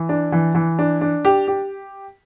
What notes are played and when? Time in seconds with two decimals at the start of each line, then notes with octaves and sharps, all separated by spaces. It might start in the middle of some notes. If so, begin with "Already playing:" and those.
Already playing: E3
0.09 D4
0.32 E3
0.55 E3
0.79 D4
1.01 D4
1.25 G4
1.47 G4